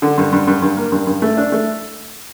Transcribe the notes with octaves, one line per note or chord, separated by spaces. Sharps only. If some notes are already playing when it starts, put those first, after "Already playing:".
D3
G2
G2
G2
G2
A#3
G2
G2
A3
D4
A3